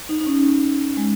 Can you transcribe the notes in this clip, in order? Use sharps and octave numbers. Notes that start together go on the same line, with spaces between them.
D#4
D#4
C#4
G#3